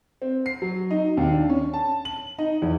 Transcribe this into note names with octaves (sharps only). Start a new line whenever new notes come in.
C4
C7
F#3
D#4
D#2
D4
C#4
A5
F#7
D#4
E2